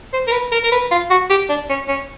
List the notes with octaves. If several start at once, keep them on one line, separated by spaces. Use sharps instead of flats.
C5
A#4
B4
A#4
A#4
B4
F4
F#4
G4
D4
C#4
C#4